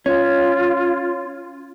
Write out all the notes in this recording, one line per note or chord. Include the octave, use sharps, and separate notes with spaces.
C#4 F4